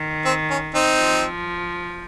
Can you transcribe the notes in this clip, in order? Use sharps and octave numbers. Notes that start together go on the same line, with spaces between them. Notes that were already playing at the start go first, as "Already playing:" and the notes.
Already playing: D#3
C4
C#4
C4 D#4
F3